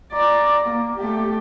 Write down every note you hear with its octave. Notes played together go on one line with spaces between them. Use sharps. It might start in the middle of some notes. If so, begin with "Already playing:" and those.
D5 A#5
A#3
A3 G4